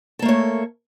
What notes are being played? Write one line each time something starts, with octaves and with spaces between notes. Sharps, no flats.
A3 A#3 A4 C#5